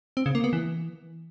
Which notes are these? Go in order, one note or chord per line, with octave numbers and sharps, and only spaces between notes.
C4
C#3
A#3
B3
E3